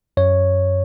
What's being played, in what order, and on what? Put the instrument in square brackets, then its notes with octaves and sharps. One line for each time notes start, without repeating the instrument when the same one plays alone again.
[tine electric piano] F#2 C#5